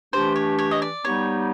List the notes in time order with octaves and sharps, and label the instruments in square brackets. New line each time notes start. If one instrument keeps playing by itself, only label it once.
[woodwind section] E3 A3 D4 G4 [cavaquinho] C5
[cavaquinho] C#5
C#5
D#5
D5
[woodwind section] G3 B3 D#4 G4 [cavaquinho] C#5